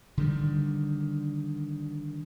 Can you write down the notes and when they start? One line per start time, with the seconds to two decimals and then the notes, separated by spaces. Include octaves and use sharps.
0.17 D3 D#3 G3